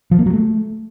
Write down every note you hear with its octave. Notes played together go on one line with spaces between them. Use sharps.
F3
A#3
F#3
A3